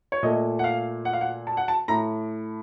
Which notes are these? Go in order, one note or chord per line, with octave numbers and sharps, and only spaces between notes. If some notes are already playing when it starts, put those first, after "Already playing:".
C#5
A#2 A3 D#5
F#5
F5
F#5
F5
F#5
A5
F#5
A5
A2 A#5